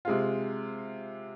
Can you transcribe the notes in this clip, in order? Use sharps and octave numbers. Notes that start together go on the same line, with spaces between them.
C3 G#3 F4